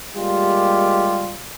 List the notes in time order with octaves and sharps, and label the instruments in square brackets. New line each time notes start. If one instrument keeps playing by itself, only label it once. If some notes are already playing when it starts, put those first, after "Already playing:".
[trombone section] G3 G#3 A#3 F4 G4